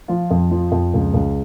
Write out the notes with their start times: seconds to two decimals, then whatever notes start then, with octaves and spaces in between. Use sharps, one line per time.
0.08 F3 F4
0.31 F2
0.51 F3
0.72 F2
0.94 C#2
1.14 C#2